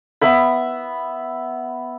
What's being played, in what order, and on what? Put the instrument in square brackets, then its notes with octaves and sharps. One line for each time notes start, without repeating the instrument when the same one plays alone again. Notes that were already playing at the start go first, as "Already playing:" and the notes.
[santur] B3 E5 B5